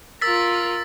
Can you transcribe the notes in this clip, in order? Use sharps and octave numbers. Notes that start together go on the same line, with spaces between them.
F4 A#4 E6 A6 B6